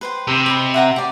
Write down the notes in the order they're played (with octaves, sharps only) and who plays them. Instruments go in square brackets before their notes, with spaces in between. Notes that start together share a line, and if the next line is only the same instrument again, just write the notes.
[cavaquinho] B4 C5 G5
[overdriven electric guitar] C3
[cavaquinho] D#5 B5
E5 F#5 A#5
G4 D5